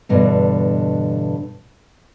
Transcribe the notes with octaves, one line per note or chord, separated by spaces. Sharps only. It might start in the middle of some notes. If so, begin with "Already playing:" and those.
E2 G2 B2 D3